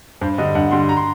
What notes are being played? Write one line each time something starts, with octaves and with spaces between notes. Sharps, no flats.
G2 C5
D3 G3 D#5
G2 F#5
D3 G3 C6
A#5
C6